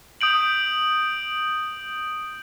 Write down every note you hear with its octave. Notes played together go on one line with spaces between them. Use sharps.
D#6 G6 D7 F#7